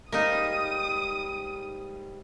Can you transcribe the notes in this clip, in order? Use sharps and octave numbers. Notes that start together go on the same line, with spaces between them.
G#2 G3 A#3 D#4 D#6